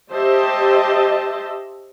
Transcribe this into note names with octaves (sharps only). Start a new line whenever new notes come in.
G4 C5 D#5 E5 A5